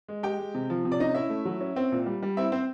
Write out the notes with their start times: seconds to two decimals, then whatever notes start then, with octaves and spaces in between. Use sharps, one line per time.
0.08 G#3
0.23 G#3 G4 G5
0.39 G#3
0.55 C3
0.70 F3
0.85 C3
0.92 D5
1.00 C#4 D#4 D#5
1.14 C#4 E4 E5
1.30 A3
1.45 F#3
1.61 C#4
1.76 C4
1.92 A#2
2.06 G3
2.22 G3
2.37 C4 E4 E5
2.52 C4 C5